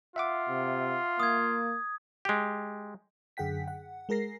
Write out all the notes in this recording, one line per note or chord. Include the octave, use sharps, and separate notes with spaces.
F4 E5 F#5 D6
C3
A#3 D#6 G#6
G#3 G4
F#2 D3 G#4 F#5 G5 B6
F#5
G#3 G#4 A#4 A#6 C7